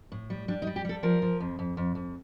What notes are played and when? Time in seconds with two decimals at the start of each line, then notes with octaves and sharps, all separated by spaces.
0.12 A2
0.30 G3
0.48 G3 D4
0.62 D#4
0.67 G3
0.76 G4
0.85 G3 A4
1.03 F3 A#4
1.22 F3
1.40 F2
1.59 F2
1.77 F2
1.95 F2